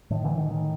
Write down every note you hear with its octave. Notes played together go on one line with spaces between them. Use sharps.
A2 D#3
D3 E3
D#3
D#3